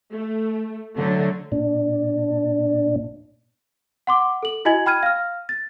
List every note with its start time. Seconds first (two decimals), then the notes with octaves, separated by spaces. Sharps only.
0.13 A3
0.96 D3 F#3 A3
1.52 A#2 D4
4.07 F#5 C6 D6
4.43 A4 F#7
4.65 E4 F#4 D#5 G#5 G#6 F#7
4.86 G5 B5 F6 G#6 D#7
5.03 F5 F6
5.49 A6